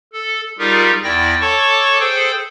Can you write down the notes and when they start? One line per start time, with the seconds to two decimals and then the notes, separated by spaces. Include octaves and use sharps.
0.13 A4
0.59 G3 D#4 F4 G4 G#4 A#4
1.03 E2 E4 D5 G5 A#6
1.41 A4 C#5 A5 C#6 D6
2.00 G#4 A4 C5 G5